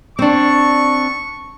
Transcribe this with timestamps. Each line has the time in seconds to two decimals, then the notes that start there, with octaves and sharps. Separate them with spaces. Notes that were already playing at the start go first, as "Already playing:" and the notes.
0.19 C4 D4 C#6